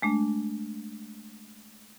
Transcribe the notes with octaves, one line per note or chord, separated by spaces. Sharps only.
G#3 A3 D4